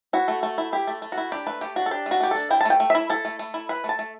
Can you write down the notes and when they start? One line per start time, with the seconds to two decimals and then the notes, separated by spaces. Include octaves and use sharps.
0.13 E4 F#4
0.28 A3
0.43 A3
0.58 E4
0.73 E4 G4
0.87 A3
1.02 A3
1.12 F#4
1.17 E4
1.32 D4 G4
1.46 A3 B4
1.61 A3 G4
1.76 D4 F#4
1.86 A4
1.91 D4 G4
2.06 A3
2.11 F#4
2.20 A3 G4
2.31 D4 A4
2.50 E4 G5
2.61 A5
2.65 A3 G5
2.80 A3
2.90 E4 E5
3.09 E4 A4
3.25 A3
3.39 A3
3.54 E4
3.69 E4 B4
3.84 A3
3.89 A5
3.99 A3